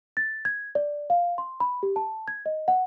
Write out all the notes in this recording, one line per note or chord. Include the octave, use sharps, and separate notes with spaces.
A6
G#6
D5
F5
C6
B5
G4
A5
G#6
D#5
F#5